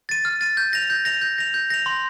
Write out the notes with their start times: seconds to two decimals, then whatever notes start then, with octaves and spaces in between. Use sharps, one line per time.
0.09 A6 D#7
0.25 F6
0.41 A6 D#7
0.57 G6
0.73 A#6 F7
0.90 G6
1.05 A#6 F7
1.21 G6
1.38 A#6 F7
1.54 G6
1.70 A#6 F7
1.86 C6